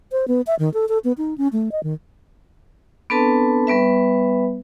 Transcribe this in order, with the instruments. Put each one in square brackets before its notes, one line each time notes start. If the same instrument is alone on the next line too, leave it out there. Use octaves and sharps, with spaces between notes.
[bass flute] C5
B3
E5
D#3
A4
A4
B3
D#4
C#4
A3
D#5
D#3
[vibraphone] B3 C4 D4 A4 B4 A5
G3 B3 B4 E5